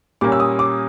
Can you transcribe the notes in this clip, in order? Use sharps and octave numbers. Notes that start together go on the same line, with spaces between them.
A#2 G3 A#3 C#4 D6
E6
D#6
D6